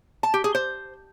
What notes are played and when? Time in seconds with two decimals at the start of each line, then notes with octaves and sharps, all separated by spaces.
0.23 A5
0.34 G4
0.44 G#4
0.55 C5